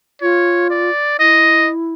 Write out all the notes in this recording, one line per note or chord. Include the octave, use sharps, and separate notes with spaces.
F4 C#5
D5
E4 D#5